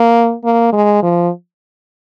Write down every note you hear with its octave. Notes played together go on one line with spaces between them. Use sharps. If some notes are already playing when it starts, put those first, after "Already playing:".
Already playing: A#3
A#3
G#3
F3